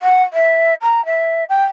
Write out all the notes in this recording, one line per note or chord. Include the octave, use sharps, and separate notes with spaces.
F#5
E5
A#5
E5
G5